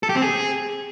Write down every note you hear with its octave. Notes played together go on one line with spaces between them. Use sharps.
A4
G4
C4
G#4